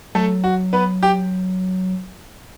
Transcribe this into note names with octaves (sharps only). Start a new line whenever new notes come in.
F#3 A3 A4
F#4
B3 B4
G4 G5